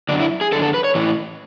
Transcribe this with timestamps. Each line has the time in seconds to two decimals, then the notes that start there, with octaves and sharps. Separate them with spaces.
0.09 F#2 D3 D4
0.20 E4
0.41 G#4
0.52 D3 A4
0.55 F#2
0.63 A4
0.74 B4
0.84 C#5
0.95 A2 E3